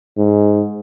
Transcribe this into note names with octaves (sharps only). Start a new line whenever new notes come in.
G#2